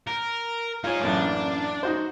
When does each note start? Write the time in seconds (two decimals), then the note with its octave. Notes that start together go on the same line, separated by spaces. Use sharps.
0.07 A#4
0.84 D#4 F4 G#4 C#5
1.01 A1 F#2 A#3 D4
1.83 D#4 F#4 C5